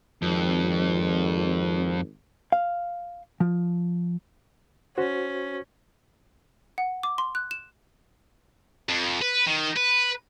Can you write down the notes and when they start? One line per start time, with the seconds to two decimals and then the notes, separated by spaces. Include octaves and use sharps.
0.22 G#1 F2
2.52 F5
3.40 F3
4.98 C#4 F#4 C5
6.78 F#5
7.03 D6
7.18 C6
7.35 F#6
7.51 E7
8.89 F2
9.22 B4
9.47 D#3
9.77 B4